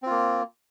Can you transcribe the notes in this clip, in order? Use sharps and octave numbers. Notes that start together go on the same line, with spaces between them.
A#3 C4 F4